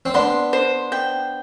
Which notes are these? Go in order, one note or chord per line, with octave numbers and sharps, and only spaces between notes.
C4
B3 D4 C6
C5
G5